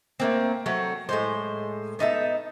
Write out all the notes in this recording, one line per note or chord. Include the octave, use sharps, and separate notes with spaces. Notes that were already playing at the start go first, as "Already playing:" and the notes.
A3 A#3 C4
F#3 A3 C4
A2 G#3 C5
B3 D#4 A4 E5